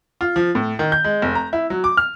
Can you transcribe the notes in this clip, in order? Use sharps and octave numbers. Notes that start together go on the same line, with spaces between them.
F4
F3
A2
D#3
G6
G#3
F1
A#5
E4
F#3
D6
F6